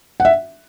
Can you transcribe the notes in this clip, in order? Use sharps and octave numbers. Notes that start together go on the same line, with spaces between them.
F#5
E5